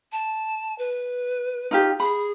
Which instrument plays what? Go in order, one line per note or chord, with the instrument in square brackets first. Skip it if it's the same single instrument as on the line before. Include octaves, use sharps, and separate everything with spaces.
[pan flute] A5
B4
[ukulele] D#4 F4 G4
[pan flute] G#4 [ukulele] B5